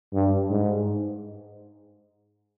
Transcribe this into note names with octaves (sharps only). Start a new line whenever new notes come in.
G2
G#2